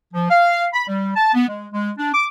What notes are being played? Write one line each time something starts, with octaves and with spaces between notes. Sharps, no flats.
F3
F5
B5
G3
A5
B3
G#3
G#3
D4
D6